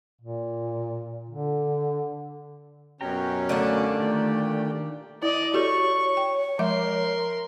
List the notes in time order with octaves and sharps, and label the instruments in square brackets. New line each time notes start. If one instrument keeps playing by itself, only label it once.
[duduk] A#2
D3
[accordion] F#2 B2 C#4 [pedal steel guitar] G4 G5 A#5
[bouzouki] D3 A#3 D4 [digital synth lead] A3
[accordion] A#2 G4 [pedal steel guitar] D#3 D5
[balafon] E4 [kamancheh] D5 D#5
[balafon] F#4 G4 A4 [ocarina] C#5 [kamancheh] C#6
[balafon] G5
[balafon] F3 G#3 E5 [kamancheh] A#4 C6